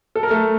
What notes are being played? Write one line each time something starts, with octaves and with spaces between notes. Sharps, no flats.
A4
A#4
A3 A4